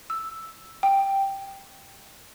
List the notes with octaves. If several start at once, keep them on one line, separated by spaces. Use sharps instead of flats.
E6
G5